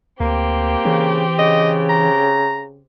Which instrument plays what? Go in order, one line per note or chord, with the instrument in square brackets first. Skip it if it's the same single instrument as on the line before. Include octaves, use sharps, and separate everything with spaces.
[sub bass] D2 [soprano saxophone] A#3 [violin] C4 G4
[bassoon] C#3 [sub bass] E3
[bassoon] C#3 [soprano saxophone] D#5
[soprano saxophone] A#5